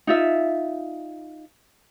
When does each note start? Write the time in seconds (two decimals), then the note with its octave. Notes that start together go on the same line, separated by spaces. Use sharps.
0.07 D#4 F4 E5